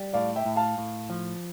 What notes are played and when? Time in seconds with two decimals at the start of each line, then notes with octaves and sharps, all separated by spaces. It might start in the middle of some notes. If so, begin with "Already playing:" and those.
Already playing: G3
0.14 A2 D5 F5
0.36 E5 G5
0.45 A2
0.56 F5 A5
0.78 A2
1.10 F3